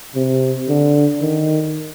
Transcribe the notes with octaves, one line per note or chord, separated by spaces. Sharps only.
C3
D3
D#3